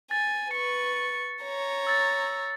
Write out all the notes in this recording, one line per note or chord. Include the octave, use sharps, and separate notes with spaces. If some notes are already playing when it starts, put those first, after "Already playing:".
G#5 A6
B4 C#6 C#7
C#5 A#5
E6 A6